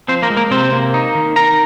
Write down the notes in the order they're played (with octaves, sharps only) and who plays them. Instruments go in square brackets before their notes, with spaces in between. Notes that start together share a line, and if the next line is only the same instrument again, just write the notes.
[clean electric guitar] F3 C4 C5
A#3 A#4
G#3
A#3 A#4
C3 C4 C5
A#3
D#4
D#3
D#3 A#4 A#5